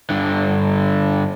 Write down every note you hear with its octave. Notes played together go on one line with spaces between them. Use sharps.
G2 D3